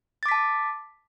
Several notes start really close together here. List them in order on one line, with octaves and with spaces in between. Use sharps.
A6 D6 B6 A5